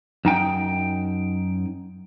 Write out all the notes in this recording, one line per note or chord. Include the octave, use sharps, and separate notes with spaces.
F#2 D#4 G5